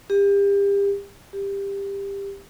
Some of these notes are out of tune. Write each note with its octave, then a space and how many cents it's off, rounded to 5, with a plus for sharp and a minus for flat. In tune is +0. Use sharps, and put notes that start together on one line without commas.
G4 +35
G4 +20